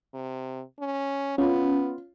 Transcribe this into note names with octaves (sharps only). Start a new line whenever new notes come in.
C3
C#4
B3 C#4 F4